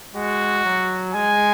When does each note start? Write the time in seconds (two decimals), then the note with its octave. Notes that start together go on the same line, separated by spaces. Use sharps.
0.15 G#3 F#4
0.65 F#3
1.13 G#3 G#5